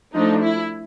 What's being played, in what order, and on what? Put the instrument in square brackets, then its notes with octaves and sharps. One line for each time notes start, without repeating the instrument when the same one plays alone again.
[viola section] F3 A3 D4 D#4
E4